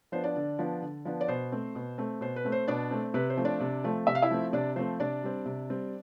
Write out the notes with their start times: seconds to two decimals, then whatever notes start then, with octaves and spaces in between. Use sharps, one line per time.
0.12 F3 B3 D4 C5
0.24 D4 D5
0.36 D3
0.59 F3 B3 D4
0.82 D3
1.05 F3 B3 D4
1.21 D5
1.28 B2 C5
1.52 A3 C4
1.75 B2
1.98 A3 C4
2.21 B2 C5
2.36 B4
2.45 A3 C4
2.52 C5
2.68 B2 D4 D5
2.91 A3 C4
3.14 C3 B4
3.30 C5
3.37 F3 A3 C4
3.45 D4 D5
3.60 C3
3.84 F3 A3 C4
4.07 C3 E5
4.15 F5
4.22 E4 E5
4.31 F3 A3 C4
4.53 C3 D4 D5
4.76 F3 A3 C4 C5
5.00 C3 D4 D5
5.23 G3 C4
5.46 C3
5.70 G3 C4